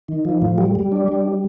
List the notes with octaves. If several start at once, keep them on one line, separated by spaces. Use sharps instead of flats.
D#3
F3
A2
G3
G3
D4
G3